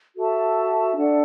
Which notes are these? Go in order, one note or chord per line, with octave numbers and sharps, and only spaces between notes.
F#4 A4 E5 A5
D4 A4 D5 F#5